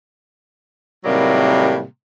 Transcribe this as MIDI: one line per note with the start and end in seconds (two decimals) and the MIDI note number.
1.04 1.82 45
1.04 1.82 48
1.04 1.82 51
1.04 1.82 54
1.04 1.82 55
1.04 1.82 58